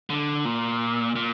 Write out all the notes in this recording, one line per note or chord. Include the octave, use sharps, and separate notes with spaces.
D3
A#2
A#2